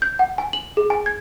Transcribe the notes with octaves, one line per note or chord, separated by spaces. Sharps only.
G6
F#5
G#5
F#7
G#4
G#5
G#6